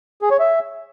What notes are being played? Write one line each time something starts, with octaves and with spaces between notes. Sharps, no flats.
G#4
C#5
E5